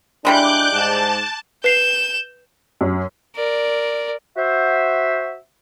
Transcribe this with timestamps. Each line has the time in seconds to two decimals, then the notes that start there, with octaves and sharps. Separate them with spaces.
0.25 E3 G3 G#3 D4 D6 F#6 G6
0.72 G#2 A5
1.64 B4 G6 C7 E7 F7
2.81 F#2
3.36 A#4 D5
4.37 F#4 C5 E5